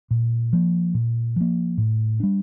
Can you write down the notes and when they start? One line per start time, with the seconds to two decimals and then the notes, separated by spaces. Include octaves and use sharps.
0.11 A#2
0.53 F3 A#3
0.94 A#2
1.36 F3 A#3
1.78 A2
2.20 G3 D4